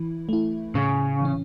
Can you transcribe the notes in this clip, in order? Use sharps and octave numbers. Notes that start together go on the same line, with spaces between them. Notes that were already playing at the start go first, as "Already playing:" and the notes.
Already playing: E3 E4
A3 E4
A2 C#3
E3 C#4